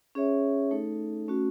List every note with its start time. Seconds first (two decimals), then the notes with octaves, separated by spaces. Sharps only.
0.15 C#4 G#4 C#5 E5
0.71 A3 D#4 A4
1.28 A3 C#4 F#4